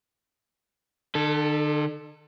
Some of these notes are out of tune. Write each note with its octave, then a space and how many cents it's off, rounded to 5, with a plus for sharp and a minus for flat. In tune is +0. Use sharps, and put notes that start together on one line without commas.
D3 +45 A4 +0